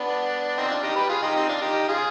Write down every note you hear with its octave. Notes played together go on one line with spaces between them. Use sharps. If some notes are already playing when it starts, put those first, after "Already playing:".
Already playing: B3 D4
C4 D#4
D4 F4
D#4 G4
G4 B4
F4 G#4
D#4 G4
C4 D#4
D4 F4
D#4 G4
F4 G#4